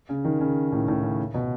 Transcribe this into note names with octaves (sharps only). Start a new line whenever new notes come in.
C#3
D#3
C#3
A2
A2
C#3
B2